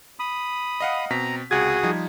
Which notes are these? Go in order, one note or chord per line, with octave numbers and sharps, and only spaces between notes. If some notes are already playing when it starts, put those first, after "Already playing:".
B5 D#6
D#5 F5 F#5
B2 C4 A#5 B6
C#2 C3 F#4 G#4 D#6 G#6
F3 G3 D#4